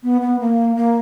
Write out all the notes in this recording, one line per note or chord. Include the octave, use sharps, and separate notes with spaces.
B3
B3
A#3
A#3